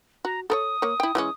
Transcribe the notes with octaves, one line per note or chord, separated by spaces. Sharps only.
F#4 A#5
A4 A#4 C#5 D#6
A#3 C#5
E4 G5
E3 G#3 C#4